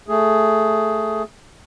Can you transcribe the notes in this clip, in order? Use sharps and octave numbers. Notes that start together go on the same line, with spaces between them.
A3 G#4